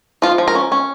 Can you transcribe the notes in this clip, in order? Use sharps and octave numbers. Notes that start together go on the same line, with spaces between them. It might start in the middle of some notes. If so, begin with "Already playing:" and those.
F3 F4
F3
A#4
C#4
C#4